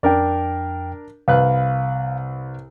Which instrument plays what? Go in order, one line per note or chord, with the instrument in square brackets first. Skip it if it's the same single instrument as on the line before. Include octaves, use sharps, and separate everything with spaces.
[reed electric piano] F2 G5 [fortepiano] D4 A#4 D5
[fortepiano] C2 B4 F#6 [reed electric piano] F5